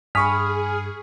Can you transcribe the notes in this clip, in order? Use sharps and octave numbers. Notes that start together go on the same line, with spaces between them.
G2 G#4 G#5 B5 C#6 D#6 F6 B6